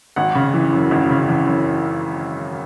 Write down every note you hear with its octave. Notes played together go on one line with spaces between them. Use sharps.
G#1 F#5
C#3
E3
F#2
G#1
C#3
E3
F#2